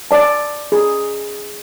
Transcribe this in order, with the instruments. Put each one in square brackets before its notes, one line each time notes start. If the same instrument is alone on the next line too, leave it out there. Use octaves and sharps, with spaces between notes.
[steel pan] D5 A5
G#4